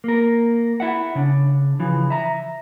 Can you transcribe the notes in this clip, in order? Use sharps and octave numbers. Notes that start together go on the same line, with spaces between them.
A#3 A#4
E4 E5 F#5
C#3 D4
C#3 E3 F3
E5 A#5